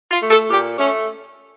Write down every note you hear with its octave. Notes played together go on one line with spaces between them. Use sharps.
F4
A3
A4
A#2 G4
A3 C#4